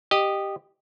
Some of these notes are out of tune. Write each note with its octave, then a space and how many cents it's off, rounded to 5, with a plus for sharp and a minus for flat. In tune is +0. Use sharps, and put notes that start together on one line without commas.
G4 +0 D#5 -15